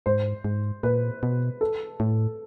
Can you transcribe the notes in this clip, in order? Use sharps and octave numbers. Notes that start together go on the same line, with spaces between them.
G#2 C5
G#2
A#2 B4
B2
A4
A2